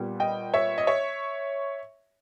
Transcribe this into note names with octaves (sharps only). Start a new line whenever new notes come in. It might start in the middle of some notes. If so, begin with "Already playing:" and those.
Already playing: A#2 G3 B3
D#5 G5
C#5 E5
D#5
C#5 E5